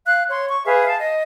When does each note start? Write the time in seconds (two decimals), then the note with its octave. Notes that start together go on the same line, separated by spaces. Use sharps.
0.05 F5 F#6
0.29 C#5 C6
0.48 C#6
0.65 G#4 B4 E5 F5
0.86 F5 A5
0.99 D#5